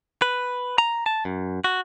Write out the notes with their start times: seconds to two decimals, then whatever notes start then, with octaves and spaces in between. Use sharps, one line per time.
0.22 B4
0.78 A#5
1.06 A5
1.25 F#2
1.64 F#4